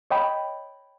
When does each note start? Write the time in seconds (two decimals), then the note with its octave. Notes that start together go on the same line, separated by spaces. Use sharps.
0.10 C#5 D#5 G5 B5